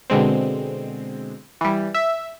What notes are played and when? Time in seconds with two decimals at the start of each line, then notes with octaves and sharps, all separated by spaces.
0.10 B2 D3 G#3 C4
1.61 E3 G3
1.94 E5